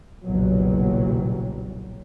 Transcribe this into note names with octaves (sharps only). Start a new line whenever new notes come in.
F#1 B1 E2 A#2 F#3 G3